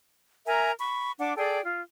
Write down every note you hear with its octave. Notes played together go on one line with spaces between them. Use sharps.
A#4 E5 G#5 A#5
B5 C#6
D4 F#5 D6
G#4 A4 D5 G5
F4